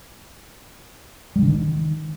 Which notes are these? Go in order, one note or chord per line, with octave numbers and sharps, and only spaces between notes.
G3
D3
D#3